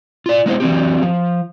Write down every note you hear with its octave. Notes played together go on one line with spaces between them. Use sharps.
F4 D5
G#3 B3 D#4 E4 C5
E3 F#3 C4 G4
F3